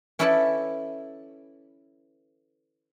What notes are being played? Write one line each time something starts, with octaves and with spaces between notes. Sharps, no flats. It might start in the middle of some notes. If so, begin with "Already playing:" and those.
C#4 E4 A4 B4 D5 A5